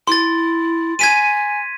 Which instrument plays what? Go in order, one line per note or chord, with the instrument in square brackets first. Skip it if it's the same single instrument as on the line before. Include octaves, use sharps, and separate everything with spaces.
[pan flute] E4 [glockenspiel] C6 A6
[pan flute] G#5 [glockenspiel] G#6 B6 D#7